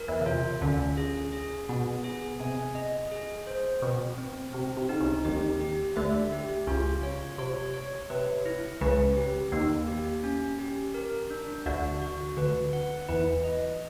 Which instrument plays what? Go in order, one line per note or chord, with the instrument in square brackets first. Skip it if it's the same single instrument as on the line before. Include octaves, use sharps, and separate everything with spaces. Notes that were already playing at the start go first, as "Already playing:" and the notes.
Already playing: [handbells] A#4
[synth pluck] E2 E3
C#3
[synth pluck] C3 [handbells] F4
[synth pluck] D2 D3 [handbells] C#4
[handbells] G#4
G#4
[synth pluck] B2 [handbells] B3
[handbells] G#4
[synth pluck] C3 [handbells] G#5
[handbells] D#5
G#4
C5
[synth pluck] B2 [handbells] C4
[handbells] C4
[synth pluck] C3 [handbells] C4
[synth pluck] C3
[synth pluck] D3 [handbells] D#4
[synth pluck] C#2 C#3
[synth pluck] D#2 D#3 [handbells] G4
[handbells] G4
[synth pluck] D2 D3 [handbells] E5
[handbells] G4
[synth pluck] C#2 C#3 [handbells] F4
[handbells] C#5
[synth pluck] C3 [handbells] C#5
[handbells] C#5
[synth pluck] C3 [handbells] B4
[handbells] E4
[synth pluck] C#2 C#3 [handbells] B4
[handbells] G4
[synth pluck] D#2 D#3 [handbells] A#3
[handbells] G4
C#4
G4
A#4
D4
[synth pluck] D2 D3 [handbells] F#4
[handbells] F#4
[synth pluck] D2 D3 [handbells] B4
[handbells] F#5
[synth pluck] E2 E3 [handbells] B4
[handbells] D#5